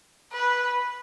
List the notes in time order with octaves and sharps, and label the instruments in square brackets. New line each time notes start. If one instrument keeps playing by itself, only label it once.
[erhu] B4